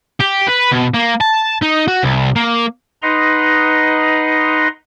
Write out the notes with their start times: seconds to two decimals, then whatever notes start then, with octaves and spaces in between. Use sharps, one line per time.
0.21 G4
0.49 B4
0.72 B2
0.94 A#3
1.21 A5
1.62 D#4
1.88 F#4
2.03 C2
2.36 A#3
3.02 D#4 B4 D#5 F#5 A#5 C6